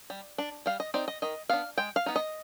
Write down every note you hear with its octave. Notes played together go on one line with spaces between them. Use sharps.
G3
D4
G3 F5
D#5
C4 D#4 D5
D#5
D#3 D#5
B3 D4 F5
G#3 G5
F5
B3 D#4
D#5